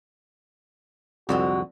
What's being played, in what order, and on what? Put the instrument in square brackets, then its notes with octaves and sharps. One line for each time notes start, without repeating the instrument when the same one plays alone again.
[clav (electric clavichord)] C2 F2 [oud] D3 G#3 C4 [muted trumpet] F#4